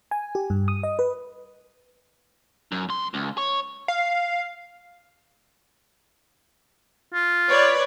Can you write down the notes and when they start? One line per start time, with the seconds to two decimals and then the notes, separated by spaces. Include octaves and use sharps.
0.11 G#5
0.35 G4
0.50 G2
0.68 D#6
0.83 D#5
0.99 B4
2.72 F#2
2.89 C2 C6
3.14 C#2
3.38 C#5
3.88 F5
7.14 F4
7.49 B4 C#5 D5